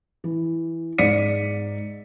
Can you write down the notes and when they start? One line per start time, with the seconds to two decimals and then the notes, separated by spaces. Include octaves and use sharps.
0.24 E3
0.98 G#2 D5 B6 C#7 D#7